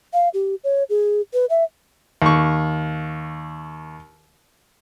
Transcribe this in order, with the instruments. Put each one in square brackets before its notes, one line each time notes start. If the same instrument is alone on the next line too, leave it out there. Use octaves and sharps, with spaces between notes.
[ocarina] F5
G4
C#5
G#4
B4
E5
[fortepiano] D#2 C#6